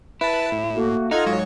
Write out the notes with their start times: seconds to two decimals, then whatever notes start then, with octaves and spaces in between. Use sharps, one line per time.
0.21 E4 B4 A5
0.52 A2
0.74 A3 A#3 F#4
1.11 D#4 F4 A4 D#5 F#5 F6 G#6
1.26 G#2 F#3 C#5